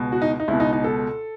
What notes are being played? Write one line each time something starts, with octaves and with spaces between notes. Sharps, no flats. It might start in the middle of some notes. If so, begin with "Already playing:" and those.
Already playing: C#2 B2
F#4
D#4
D#4
C#2 E4
B2
D#4
D#4
A4